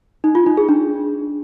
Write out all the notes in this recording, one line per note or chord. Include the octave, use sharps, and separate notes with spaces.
D#4
F4
D#4
G#4
D4